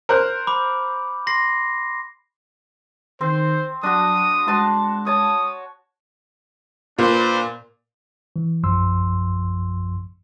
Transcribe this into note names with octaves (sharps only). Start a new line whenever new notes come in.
A#4 C5 F#6
B5 D6
C6 A#6 C7
D#3 C4 C5
F#3 D4 F#4 D#6
G#3 F#4 A5 C6
C#5 A5 D#6
A#2 D4 B4 C5
E3
A#1 F#2 F3 C6 E6